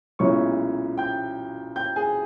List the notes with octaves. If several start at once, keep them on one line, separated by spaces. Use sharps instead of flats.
B1 A#2 G#3 C#4 E4 C#5 C#6
G5 G6
G5 G6
G#4 G#5